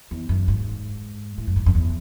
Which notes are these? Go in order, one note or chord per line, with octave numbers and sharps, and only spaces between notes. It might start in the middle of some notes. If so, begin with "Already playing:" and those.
E2
F#2
G#2
A2
F#2
G#2
F#2
E2